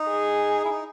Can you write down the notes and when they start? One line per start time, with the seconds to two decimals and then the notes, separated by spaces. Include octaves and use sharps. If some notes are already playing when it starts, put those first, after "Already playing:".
Already playing: D#4
0.08 G#4
0.65 E4
0.70 D#4